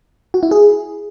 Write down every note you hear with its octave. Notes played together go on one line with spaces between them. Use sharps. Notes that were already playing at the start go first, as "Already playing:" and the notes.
F#4
E4
G#4